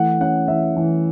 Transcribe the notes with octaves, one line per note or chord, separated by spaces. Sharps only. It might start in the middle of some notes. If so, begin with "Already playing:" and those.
Already playing: E3 A3 F#5
C#4 F#5
E3 E5
E3